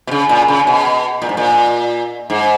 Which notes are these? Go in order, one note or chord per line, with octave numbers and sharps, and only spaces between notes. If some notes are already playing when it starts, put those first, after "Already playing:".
B2
C#3
A#2
C#3
B2
A#2
G#2
A#2
G#2